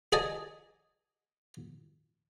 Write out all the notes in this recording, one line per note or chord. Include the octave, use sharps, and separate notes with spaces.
G#4 D5 D#5 G#5 A5